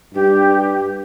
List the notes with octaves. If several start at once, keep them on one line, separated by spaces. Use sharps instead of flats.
G2 G4